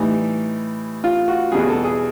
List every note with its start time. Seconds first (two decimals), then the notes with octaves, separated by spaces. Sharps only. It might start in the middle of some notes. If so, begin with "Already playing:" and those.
Already playing: A2 E3 G3 D#4
1.04 F4
1.28 F#4
1.52 E2 B2 G3 G#4
1.69 A4
1.84 G#4